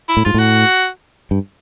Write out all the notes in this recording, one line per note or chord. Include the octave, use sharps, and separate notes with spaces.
E4
A2
G#2 F4
A2 F#4
G2